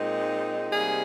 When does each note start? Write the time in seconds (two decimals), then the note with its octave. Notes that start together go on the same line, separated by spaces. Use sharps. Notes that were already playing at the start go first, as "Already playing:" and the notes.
Already playing: A#2 G#3 C4 D#4
0.72 C3 G3 A#3 D#4 G#4